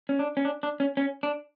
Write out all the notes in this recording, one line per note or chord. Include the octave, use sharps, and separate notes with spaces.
C#4
D4
C#4
D4
D4
C#4
C#4
D4